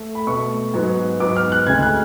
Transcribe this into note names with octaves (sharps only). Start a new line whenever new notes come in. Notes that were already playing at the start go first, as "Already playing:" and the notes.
Already playing: A3
B5
B2 A3 C#6
G#2 F#3 B3
G#2 F#3 B3 D6
F6
F#6
D2 C#3 G#3 G#6
F#6